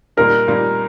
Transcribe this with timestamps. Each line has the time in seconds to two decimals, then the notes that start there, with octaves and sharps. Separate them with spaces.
0.17 A#2 G3 A#3 D#4 A#4
0.48 A#2 G3 A#3 D#4